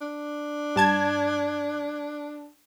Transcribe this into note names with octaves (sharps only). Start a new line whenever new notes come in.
D4
G2 A5 G#6